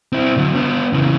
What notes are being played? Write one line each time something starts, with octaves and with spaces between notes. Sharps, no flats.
C4 E4
D3 F#3
B3 D4
C#3 E3